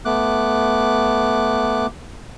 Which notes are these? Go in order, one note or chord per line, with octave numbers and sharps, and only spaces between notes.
A3 B3 D6 F#6